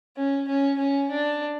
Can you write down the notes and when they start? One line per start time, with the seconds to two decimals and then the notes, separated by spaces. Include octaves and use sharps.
0.16 C#4
0.48 C#4
0.78 C#4
1.10 D4